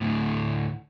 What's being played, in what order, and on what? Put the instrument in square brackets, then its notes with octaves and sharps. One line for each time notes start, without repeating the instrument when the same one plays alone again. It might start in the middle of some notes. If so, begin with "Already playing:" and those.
[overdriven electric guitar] D2 A2